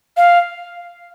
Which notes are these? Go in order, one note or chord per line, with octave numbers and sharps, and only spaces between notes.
F5